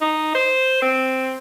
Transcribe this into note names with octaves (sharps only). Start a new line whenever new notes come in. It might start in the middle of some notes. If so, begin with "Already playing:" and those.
D#4
C5
C4